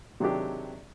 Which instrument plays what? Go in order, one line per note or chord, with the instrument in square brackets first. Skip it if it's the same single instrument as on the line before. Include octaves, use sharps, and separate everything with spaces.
[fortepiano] C3 D#3 F#3 G#3 D4 G4